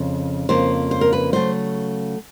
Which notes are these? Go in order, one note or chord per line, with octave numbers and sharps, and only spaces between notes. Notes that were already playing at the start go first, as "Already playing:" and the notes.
Already playing: F2 C#3
F2 C#3 F3 A#3 C5
C5
A#4
B4
C#3 F#3 A3 C5